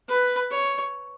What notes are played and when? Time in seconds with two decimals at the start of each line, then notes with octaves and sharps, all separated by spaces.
0.08 B4
0.50 C#5